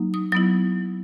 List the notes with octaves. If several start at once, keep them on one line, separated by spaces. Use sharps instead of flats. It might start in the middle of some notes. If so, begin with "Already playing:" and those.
Already playing: F#3 A#3 D#4
D#6
F#3 B3 E4 D#6